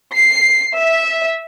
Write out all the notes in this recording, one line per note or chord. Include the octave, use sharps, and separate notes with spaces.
C7
E5